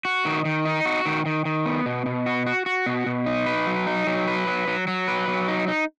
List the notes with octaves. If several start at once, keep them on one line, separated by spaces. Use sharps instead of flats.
F#4
D#3
D#3
D#4
F#4
D#3
D#3
D#3
B3
B2
B2
F#4
F#4
F#4
B2
B2
D#4
B4
F#3
D#4
F#3
B4
F#3
F#3
F#3
B4
F#3
D#4
D#4